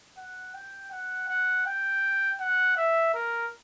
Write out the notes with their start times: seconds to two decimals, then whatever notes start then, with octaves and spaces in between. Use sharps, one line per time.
0.18 F#5
0.54 G5
0.92 F#5
1.29 F#5
1.66 G5
2.40 F#5
2.77 E5
3.14 A#4